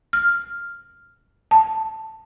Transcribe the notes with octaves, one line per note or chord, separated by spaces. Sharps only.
F6
A5